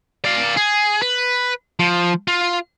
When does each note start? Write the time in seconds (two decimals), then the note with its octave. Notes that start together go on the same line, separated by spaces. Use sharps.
0.25 D5 F5
0.57 G#4
1.02 B4
1.79 F3
2.28 F4